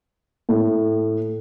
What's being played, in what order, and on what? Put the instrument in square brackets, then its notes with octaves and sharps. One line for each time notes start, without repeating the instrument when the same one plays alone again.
[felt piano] A2